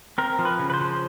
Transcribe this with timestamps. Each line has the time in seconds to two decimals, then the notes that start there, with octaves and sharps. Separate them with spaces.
0.18 C4 A#4
0.39 F3
0.45 B4
0.59 C#3
0.70 B4
0.74 C5
0.81 F3